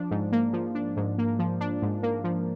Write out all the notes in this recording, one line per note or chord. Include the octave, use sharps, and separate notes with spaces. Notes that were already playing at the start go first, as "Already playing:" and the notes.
Already playing: F3 D4
G#2
A#3
F3
D4
G#2
A#3
F3
D4
G#2
A#3
F3